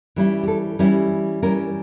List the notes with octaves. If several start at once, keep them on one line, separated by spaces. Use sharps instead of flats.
E3 G3 C#4 E4
G4
A4
E3 G3 C#4 E4 G4
E3 G3 C#4 E4 A#4